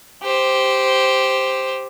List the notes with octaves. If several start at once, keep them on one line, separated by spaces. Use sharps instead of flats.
G4 C5